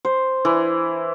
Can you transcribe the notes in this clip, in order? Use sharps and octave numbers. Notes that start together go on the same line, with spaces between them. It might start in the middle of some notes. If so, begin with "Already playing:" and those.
C5
E3